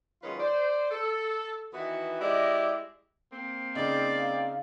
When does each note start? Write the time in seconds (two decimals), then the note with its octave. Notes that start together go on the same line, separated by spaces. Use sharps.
0.23 D#3 F#3 G#3 C#4 F4 B4
0.39 C5 D5
0.91 A4
1.74 D#3 E3 B3 F#4
2.21 G#3 E4 G4 D5 D#5
3.32 A#3 C4
3.75 C#3 D#4 D5
4.17 F5